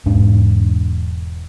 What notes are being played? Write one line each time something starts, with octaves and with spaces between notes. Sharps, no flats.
E1 G#2 D4